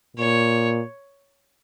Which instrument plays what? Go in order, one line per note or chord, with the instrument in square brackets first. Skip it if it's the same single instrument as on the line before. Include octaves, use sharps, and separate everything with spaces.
[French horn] A#2 [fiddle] C#5